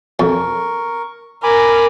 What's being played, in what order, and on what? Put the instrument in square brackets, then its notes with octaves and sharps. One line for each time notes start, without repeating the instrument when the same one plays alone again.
[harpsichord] F2 [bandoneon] A#4 C#6
[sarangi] A#4 [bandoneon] G#5 B5 D6